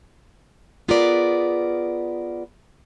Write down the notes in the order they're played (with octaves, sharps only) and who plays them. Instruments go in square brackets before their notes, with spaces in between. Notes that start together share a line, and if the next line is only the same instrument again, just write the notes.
[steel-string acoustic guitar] B3 F4 G#4 A#4 B4 D5